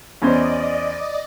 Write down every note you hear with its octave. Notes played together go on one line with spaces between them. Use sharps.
E2 C#4 C5 D5 D#5